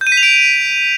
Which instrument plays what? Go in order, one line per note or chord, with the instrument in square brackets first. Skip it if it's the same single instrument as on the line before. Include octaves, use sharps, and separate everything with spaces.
[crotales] G6
D#7
B6
F7
D7